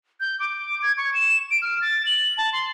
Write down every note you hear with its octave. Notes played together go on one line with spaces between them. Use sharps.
G6
D6
G#6
C#6
E7
D7
F6
A6
F#7
A5
C6